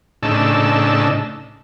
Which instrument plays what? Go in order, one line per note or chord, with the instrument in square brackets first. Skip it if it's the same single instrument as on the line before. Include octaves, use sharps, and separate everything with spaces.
[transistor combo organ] A2 C#3 D4 D#4 A5 E6